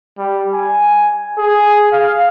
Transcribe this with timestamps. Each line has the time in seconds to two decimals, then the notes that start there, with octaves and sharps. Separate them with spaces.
0.17 G3
0.53 G#5
1.38 G#4
1.92 F5